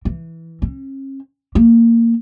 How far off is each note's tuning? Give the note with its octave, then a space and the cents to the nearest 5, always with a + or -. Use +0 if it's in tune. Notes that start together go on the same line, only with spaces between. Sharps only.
E3 -5
C#4 -45
A#3 -15